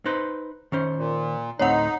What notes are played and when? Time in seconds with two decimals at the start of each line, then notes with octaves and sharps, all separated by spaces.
0.06 D#4 B4 C5
0.72 D#3 C#4 C5
0.96 A#2
1.59 D2 A2 C4 D#4 C#5 F#5